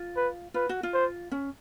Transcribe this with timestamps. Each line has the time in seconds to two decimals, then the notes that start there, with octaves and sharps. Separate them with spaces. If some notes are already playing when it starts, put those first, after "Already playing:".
Already playing: F4
0.17 B4
0.54 F4 B4
0.69 F#4
0.83 F4
0.94 C5
1.32 C#4